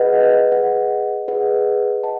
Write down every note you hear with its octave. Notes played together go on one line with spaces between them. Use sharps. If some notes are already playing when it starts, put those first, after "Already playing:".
Already playing: G#4 B4 D#5 F#5
G#4 B4 D#5 F#5
G#4 B4 D#5 F#5
D#5 F#5 A5